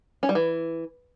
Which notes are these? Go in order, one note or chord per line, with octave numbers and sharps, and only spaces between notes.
C#4
G3
E3